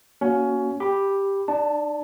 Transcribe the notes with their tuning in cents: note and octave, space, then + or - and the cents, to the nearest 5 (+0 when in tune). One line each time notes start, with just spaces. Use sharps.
A#3 +20 C#4 +15 F#4 +0
G4 +5 B5 +0
D4 +45 D5 +0 A5 +0